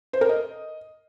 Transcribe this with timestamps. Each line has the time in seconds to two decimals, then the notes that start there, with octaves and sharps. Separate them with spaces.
0.13 C5
0.21 A#4
0.29 D#5